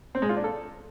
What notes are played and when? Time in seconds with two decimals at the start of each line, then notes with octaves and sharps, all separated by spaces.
0.15 C4
0.22 G#3
0.29 F4
0.37 D4
0.44 A4